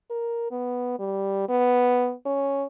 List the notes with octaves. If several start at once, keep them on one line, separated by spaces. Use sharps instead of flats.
A#4
B3
G3
B3
C#4